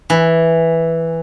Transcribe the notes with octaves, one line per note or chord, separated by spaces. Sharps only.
E3